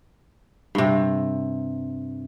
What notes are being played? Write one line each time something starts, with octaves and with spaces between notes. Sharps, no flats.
G2 C3